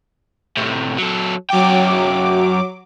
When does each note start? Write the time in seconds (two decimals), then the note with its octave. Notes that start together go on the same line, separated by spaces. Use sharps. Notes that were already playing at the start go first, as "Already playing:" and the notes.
0.57 A2 C3
0.98 F#3 A4
1.50 F#2 F#3 G5 D6